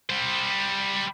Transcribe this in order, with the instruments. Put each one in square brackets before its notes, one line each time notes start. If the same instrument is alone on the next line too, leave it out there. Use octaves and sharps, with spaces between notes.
[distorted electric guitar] G3 C5